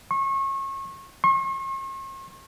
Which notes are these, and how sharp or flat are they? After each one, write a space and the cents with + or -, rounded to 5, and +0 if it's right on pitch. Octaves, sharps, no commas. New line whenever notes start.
C#6 -30
C#6 -45